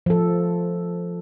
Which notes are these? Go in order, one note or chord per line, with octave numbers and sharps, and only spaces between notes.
F3 A4